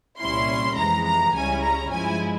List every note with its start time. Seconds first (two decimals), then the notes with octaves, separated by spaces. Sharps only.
0.20 C2 A#2 G3 C#4 E4 C6
0.77 F2 C3 E3 G#3 A#5
1.05 A#5
1.34 C#2 C#3 G3 C#4 E4 G#5
1.63 A#5
1.91 G2 F3 G#3 E4 G#5